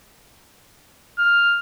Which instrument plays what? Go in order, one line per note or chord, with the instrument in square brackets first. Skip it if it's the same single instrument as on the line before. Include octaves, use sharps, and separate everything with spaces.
[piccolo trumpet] F6